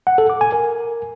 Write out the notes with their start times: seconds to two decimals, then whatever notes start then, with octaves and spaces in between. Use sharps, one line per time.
0.07 F#5
0.18 A4
0.30 D6
0.41 G#5
0.52 A#4